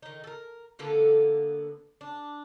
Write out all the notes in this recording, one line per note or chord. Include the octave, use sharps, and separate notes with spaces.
D#3 D#4
A4 A#4
D3 A#3 B3 A4
D4